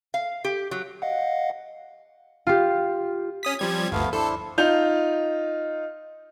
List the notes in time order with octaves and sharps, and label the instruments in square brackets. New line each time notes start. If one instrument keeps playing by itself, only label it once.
[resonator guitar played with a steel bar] F5
G4
F#3
[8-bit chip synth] D#5 F5 F#5
[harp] F4 G4
[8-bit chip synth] C#4 D#6 B6
[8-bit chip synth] F3 G3 G#6 [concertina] C4
[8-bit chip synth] G1 D2 [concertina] A3 B3 F5
[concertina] D4 E4 C5 [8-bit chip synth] A4
[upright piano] D#4 F4 G6 F7